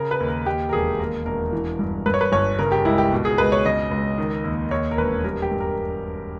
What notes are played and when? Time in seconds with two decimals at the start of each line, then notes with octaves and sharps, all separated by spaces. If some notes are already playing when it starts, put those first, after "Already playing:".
Already playing: C#3 A#4
0.11 B4
0.20 D#2
0.28 A#4
0.46 D#2 G4
0.69 A#4
0.73 E1 G#4
0.99 D#2 A#4
1.26 E1 A#4
1.52 E3
1.79 G2
2.06 G2 B4
2.14 C#5
2.21 B4
2.32 G1 C#5
2.59 C#3 A#4
2.72 G4
2.85 C#2 E4
2.98 G4
3.12 B2
3.25 G#4
3.38 C#2 B4
3.52 C#5
3.65 C#3 D#5
3.91 C#2
4.18 D#3
4.44 D#2
4.71 D#2 C#5
4.91 A#4
4.97 E1 B4
5.24 G3 A#4
5.42 G4
5.51 G2
5.60 A#4